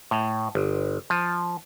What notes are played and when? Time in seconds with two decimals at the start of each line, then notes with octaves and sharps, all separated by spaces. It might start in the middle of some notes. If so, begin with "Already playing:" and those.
0.11 A2
0.55 G1
1.10 F3